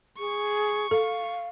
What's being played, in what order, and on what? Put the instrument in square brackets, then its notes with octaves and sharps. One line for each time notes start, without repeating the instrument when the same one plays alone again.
[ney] G#4 [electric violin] C#6
[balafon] A4 [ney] F5